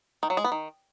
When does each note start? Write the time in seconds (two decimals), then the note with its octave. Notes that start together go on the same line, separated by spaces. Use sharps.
0.23 D#3
0.30 F#3
0.37 G#3
0.44 B3
0.52 D#3